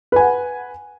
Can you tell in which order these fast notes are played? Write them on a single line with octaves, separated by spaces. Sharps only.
B4 G#5 F#5